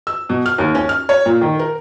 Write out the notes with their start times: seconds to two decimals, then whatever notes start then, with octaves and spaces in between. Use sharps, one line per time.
0.07 E6
0.29 B2
0.46 F6
0.58 D#2
0.75 C#4
0.89 F6
1.09 C#5
1.26 A#2
1.41 D#3
1.59 A#4